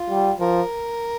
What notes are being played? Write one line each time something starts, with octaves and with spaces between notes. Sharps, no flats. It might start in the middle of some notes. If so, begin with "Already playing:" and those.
Already playing: F4
G3
F3 A#4